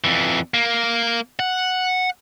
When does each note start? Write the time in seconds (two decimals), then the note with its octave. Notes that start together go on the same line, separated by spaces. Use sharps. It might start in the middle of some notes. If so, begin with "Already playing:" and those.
0.04 F2 E3
0.54 A#3
1.40 F#5